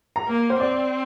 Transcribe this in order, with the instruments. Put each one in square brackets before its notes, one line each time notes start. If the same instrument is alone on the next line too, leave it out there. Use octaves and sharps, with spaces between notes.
[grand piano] A#5
[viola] A#3
[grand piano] C5
[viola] C4 [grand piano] D5